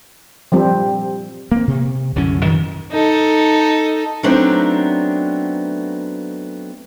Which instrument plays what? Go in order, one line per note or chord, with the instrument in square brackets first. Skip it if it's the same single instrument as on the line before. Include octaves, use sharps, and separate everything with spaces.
[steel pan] F3 G3 C4
[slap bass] A#3 C4
C3
C2 F#2 D3 C#4
F#2 D#3 E3 G3
[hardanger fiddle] D#4 A4
[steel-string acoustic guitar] F#3 A3 B3 C4 D4 D#4